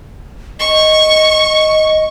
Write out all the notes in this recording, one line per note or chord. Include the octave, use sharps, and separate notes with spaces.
D#5 C#6